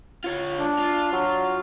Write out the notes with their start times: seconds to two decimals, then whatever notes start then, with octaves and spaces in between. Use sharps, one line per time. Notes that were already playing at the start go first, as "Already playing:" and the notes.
0.24 F4 C#5
0.59 D4
0.78 F4
1.13 F#3